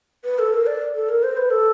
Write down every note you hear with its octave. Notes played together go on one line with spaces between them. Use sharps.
B4
A4
A#4
D5
A4
A#4
C5
B4
A4